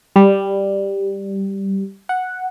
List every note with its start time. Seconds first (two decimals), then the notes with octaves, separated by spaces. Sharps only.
0.16 G3
2.09 F#5